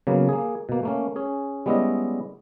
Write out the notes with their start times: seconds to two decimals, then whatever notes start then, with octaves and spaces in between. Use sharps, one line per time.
0.07 C#3 F#3 A#3 B3
0.29 A#3 G#4
0.69 B2 A#3
0.83 A3 A#3 C#4
1.16 C#4 G#4
1.66 G3 G#3 B3 C#4 E4 D#5